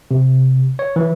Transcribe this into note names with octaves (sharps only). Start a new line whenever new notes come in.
C3
C#5
E3